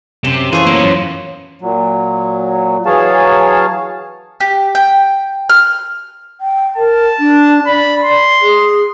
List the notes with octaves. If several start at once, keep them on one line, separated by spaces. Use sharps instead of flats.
F#2 C3
E3 F4 G#4 A4 C5 C#5
F#3 A#3 B3
F#2
A#2 F#3
E3 F#3 G#4 C#5 F5 A5
G4
G5
F6
G5
A#4 A5
D4
D5 B5
C6
G#4